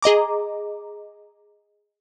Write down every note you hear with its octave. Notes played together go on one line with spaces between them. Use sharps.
G#4 D#5 A#5 D6